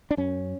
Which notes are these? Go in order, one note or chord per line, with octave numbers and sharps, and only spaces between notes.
D4
F#2 C#4